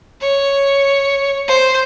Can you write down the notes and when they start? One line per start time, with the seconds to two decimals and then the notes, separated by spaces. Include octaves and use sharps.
0.21 C#5
1.48 C5